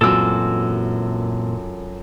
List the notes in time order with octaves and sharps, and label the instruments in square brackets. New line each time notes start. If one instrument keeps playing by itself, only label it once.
[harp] F#2 F4 [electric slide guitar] A#2 E3 C4 [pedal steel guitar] A4 E6